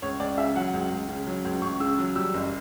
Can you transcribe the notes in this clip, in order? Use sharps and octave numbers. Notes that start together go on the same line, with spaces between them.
C#2 C#5
C#2 D5
C#3 E5
F#3 F#5
C#2
C#2
C#3
F#3
C#2
C#2 C#6
C#3 E6
F#3
G3 E6
F#1